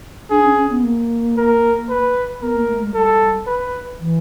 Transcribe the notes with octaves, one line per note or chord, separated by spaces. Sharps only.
D4 G#4
C#4
C#4
B3
A#3
A#4
B4
B3 A#4
A#3
A3
G#3
G3 A4
B4
E3